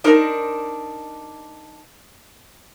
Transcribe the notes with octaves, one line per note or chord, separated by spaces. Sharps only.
D4 D#4 A#4 C5